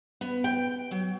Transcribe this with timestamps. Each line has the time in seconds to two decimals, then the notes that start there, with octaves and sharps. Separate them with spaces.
0.21 B3
0.44 G5
0.91 F#3